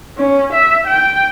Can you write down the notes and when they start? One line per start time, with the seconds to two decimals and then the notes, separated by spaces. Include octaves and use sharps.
0.17 C#4
0.54 E5
0.87 G5